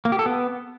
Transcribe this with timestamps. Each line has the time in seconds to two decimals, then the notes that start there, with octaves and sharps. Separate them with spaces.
0.05 A#3
0.12 G4
0.19 A4
0.26 B3